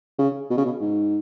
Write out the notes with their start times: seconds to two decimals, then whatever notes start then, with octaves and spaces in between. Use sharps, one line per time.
0.19 C#3
0.50 B2
0.57 C#3
0.65 B2
0.81 G#2